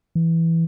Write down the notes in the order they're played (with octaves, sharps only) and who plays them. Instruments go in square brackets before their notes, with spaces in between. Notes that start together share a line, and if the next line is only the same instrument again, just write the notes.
[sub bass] E3